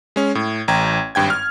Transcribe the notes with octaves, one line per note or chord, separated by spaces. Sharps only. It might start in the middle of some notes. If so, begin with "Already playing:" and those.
G#3 C#4
A2
A1 G5 A#5 G#6
G#1 G2 G5 G#6
F6